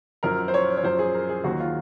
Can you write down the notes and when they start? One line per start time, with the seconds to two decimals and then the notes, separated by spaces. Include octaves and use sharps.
0.23 F#2 F3 A#4
0.48 C5
0.54 C#5
0.77 C#5
0.83 F#2 F3 C5
0.99 G#4
1.14 A#4
1.29 G#4
1.44 D#2 D#3 F#3 F#4
1.60 F4